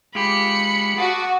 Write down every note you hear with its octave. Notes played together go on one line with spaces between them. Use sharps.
G#3 F4 G4 B5 C#7
F#4 A5 D6 D#6